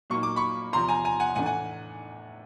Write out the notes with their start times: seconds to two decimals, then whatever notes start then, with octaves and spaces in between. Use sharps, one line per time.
0.10 A#2 F#3 A#3 D#4 C#6
0.23 D6
0.36 B5 C#6
0.72 E2 C3 F3 A#5 C6
0.88 G#5 A#5
1.05 G#5 A#5
1.20 F#5 G#5
1.35 A2 E3 A3 D4 F#5 G#5
1.46 F#5 G#5